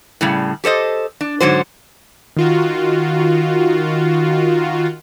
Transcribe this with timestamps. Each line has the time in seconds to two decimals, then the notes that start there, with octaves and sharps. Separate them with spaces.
0.21 A2 C#3 G3
0.64 G4 A4 C5 D#5
1.21 D4
1.40 G#2 D3 F#3 C5
2.37 D#3 F4 F#4